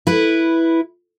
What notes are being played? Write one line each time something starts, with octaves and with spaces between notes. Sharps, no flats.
E4 B4